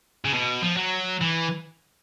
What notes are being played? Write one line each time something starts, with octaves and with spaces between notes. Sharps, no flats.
C#3
B2
F3
F#3
E3